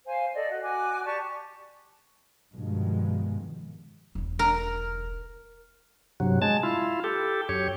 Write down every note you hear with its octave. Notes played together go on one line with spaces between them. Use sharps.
C5 F5 G#5
A4 D5 D#5
F#4 D#5
F#4 G#5 D6
G4 D5 A5 C#6
G2 B2 D#3 F3 G#3
E1 B1
A#4
G2 C3 F#3
G#3 A5
E4 F4
G4 A4
F#2 G4 C#5